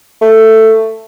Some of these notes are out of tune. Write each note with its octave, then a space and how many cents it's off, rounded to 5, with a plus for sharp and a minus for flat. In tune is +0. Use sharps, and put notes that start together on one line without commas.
A3 +10